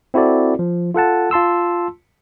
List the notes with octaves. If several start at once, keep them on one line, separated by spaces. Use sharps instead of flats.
C4 E4 F#4 A4 D5
F3
F4 A4 F#5 A5
F4 A5 C6 E6